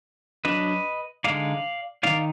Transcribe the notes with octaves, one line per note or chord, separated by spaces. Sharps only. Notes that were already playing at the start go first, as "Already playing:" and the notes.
F#3 D4 B4 D#5
D3 G#3 D#4 D5 F5
D#3 A#3 D#4 D5 F5